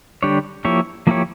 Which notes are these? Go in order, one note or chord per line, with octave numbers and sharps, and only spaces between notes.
D3 G3 D4 G4 C#5
F3 A#3 E4 G4 C#5
F3 A#3 E4 G4 C#5